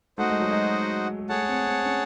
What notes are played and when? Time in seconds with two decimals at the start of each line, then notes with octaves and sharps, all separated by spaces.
0.18 A3 D#4 F#4 C5 D#5 F#5
0.30 G#3
0.40 F#3
0.50 G#3
1.19 G#3
1.29 A3 G#4 C#5 F#5 A5
1.43 A3
1.48 C4
1.67 C4
1.85 C#4